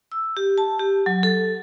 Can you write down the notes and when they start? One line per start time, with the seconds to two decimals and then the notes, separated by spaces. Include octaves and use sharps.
0.12 E6
0.37 G4
0.58 A5
0.79 G4
1.06 F#3
1.23 A4